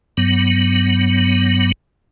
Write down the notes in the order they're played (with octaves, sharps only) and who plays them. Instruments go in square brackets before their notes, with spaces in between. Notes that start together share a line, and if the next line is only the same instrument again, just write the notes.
[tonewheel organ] G2 F#3 B3